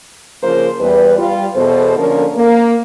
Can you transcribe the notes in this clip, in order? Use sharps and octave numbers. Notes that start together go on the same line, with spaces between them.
C#3 F3 A#3 F4 A#4 C5
E2 G3 B4
G3 F4
E2 B2 A4 C5
D3 F3 A#3 C#4 A#4
A#3